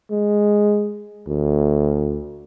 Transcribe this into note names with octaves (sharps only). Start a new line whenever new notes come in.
G#3
D2